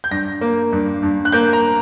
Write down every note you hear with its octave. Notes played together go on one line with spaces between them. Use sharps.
G6
G2 A#6
A#3
G2
G2
F#6
A#3 G6
A#5